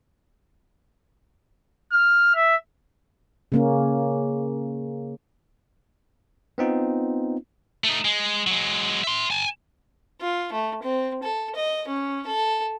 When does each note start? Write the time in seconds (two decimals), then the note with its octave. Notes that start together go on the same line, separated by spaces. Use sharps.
1.92 F6
2.35 E5
3.52 C#3 A#3 C#4
6.58 B3 C4 D#4 F4
7.84 A3 D#4
8.05 G#3
8.47 F#3 G#3
9.04 E5 C6
9.31 G#5 A5
10.21 F4
10.52 A3
10.83 C4
11.23 A4
11.55 D#5
11.88 C#4
12.27 A4